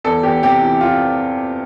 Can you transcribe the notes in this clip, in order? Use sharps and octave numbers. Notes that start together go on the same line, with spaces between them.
E2 A4
E2 G4
C3 G4
E3
F4